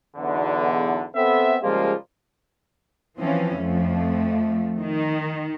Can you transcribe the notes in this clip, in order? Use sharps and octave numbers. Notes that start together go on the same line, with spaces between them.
B1 E2 D3
B3 C4 A4 B4 E5
C#3 F3 G3 G#3 A#3 F4
E3 F3 C4 C#4
F2 F3 A3
D#3